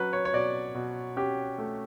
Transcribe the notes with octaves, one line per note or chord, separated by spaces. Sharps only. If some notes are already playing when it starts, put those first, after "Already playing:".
Already playing: F#3 C#4 B4 C#5
C#5
C#5
B2 D5
B2
C#4 G4
A3